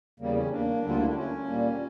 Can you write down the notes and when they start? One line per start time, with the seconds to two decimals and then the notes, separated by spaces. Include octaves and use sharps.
0.20 E2 C#3 G3 A#3
0.35 C#4
0.50 A#3 D4
0.82 D2 D3 G3 A#3
0.90 F4
0.98 E4
1.07 D4
1.15 C#4
1.46 A#2 G3 A#3